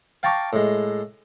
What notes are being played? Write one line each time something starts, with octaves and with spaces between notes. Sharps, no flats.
F5 G5 A5 A#5 C#6 D6
A2 G#3